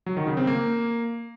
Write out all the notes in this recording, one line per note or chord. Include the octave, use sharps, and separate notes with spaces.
F#3
D#3
C#3
C4
A#3